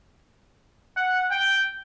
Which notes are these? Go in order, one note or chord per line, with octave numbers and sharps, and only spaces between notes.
F#5
G5